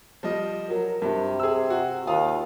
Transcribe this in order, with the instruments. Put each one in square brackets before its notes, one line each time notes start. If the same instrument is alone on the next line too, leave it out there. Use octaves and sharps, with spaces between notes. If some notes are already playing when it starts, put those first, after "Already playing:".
[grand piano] F3 G3 D#5
[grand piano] F#3 [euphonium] A#4
[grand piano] G2 [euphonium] C3
[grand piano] G#4 E6
F#4
[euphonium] D#2 [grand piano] F4 F5 D#6